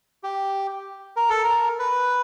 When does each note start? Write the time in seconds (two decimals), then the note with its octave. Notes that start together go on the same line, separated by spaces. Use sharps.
0.23 G4
1.16 A#4
1.29 A4
1.44 A#4
1.79 B4